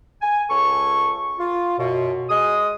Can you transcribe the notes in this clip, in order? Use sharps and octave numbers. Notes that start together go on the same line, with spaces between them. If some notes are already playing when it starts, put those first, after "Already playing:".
G#5
C#2 A4 C#5 C#6
F4
F#2 B2
G#3 G#4 D#6